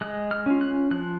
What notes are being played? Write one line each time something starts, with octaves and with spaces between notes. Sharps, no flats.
G#3 F#6
F6
C#4 F4
F#6
F3 F#6